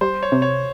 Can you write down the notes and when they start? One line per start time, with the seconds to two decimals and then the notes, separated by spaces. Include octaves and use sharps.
0.01 G3 C5
0.23 C#5
0.32 C3
0.42 C#5